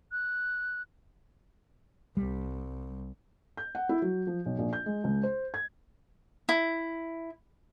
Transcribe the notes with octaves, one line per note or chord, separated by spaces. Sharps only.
F#6
C2 G3
G6
F#5
E4
F#3
F3
B1
A#1
G6
G#3
C#2
C5
G#6
E4